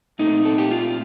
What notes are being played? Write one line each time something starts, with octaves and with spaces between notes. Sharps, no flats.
A#2 A3 C4 D#4
A4
G4
F4